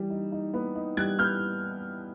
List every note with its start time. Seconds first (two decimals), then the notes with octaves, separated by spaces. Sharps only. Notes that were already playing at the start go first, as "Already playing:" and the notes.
Already playing: E3 G3
0.10 D#4
0.32 D#4
0.54 B3
0.75 D#4
0.97 G3 F#6 G#6
1.19 B3 F6 G6